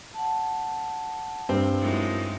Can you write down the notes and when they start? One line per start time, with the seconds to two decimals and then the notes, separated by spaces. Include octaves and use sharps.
0.14 F#5 A5
1.49 G2 C4
1.81 F#2 G#3 D#4 E4 G5